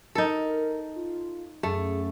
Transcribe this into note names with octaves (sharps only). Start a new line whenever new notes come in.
D#4 A4 A#4
F4
F#2 A3 G#4